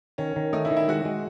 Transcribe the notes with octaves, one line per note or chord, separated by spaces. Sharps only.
D#3 C#4
D#3
A3 D#4
E4
D#3
E4
G#3 F#4
G#3